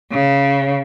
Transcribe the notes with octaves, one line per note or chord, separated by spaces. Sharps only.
C#3